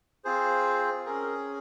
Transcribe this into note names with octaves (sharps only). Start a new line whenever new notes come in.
C4 F4 G#4 C5
C#4 G#4 A#4